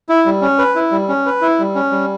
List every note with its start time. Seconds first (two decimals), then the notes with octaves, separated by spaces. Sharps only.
0.09 E4
0.26 G3
0.42 C#4
0.59 B4
0.76 E4
0.92 G3
1.09 C#4
1.26 B4
1.41 E4
1.59 G3
1.75 C#4
1.91 G3